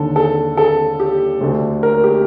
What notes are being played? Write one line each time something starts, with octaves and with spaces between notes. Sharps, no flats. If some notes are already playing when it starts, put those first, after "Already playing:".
Already playing: D#2 D3 A4
A4
A4
G4
D2 D3
A#4
G4